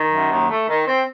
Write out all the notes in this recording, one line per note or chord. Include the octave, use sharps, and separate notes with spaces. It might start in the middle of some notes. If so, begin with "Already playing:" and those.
Already playing: D#3
F#2
D#2
A3
D#3
C4